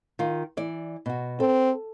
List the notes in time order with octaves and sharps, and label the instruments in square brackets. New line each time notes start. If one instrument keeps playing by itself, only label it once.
[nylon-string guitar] D#3 F4
E3 D5
B2 F#4
[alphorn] C4 [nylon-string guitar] A4